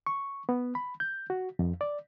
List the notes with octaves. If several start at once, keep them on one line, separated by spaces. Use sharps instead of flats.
C#6
B3
B5
G6
F#4
F2
D5